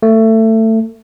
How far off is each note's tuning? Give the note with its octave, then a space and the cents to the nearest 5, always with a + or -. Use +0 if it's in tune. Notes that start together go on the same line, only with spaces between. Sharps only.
A3 +20